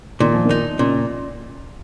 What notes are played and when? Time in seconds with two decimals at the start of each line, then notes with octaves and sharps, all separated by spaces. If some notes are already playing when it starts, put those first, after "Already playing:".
0.20 A#2 D#3
0.33 F3
0.45 D#3
0.51 D#4
0.78 A#2 C#3